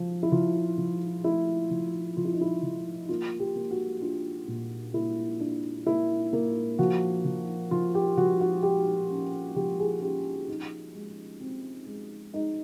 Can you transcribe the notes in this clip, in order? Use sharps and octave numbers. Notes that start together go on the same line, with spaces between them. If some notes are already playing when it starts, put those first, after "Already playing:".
Already playing: F3
E4
F3 F4
F3
A3 E4
F3
F3 F4
E4
D#4
E4
F3
A#3 F4
G4
A#3
F#4
D4 F4
A#2
A#3 E4
D4
A#3 E4
A#3
F3 F#4
F3
F3 F4
G4
F3 F#4
F#4
G#3 G4
C#4
F3 G4
G#4
C#4 G4
D#4
G#3
C4
G#3
G#3 D#4